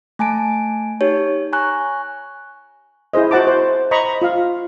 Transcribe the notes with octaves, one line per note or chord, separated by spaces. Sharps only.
A3 G#5 A5 D7
D#4 G4 C#5
G#5 A#5 C#6 F#6
E4 G#4 C5 D#5
F#4 C5 F#5 A5 D6
C5
C5 D#5 A#5 B5 C#6
F4 F5